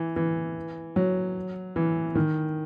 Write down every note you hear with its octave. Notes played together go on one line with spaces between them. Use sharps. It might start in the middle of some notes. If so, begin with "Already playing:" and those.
Already playing: E3
E3
F#3
E3
D#3